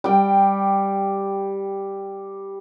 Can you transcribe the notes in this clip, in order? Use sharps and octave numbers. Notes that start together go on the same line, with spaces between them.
G3 G5